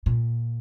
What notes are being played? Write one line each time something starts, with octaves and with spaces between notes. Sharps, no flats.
A#2